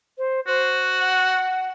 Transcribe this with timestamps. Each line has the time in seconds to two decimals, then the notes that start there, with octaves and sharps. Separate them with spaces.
0.18 C5
0.47 F#4 C5
1.01 F#5